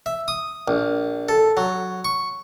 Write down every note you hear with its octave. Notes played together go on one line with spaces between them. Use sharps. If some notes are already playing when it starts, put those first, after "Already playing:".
E5
D#6
A#1
A4
F#3
C#6